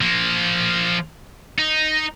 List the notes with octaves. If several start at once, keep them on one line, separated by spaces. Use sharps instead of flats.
F3 A#3
D#4